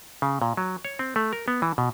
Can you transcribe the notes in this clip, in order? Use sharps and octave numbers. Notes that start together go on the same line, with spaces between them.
C#3
A#2
F#3
C#5
C4
A3
A#4
B3
E3
B2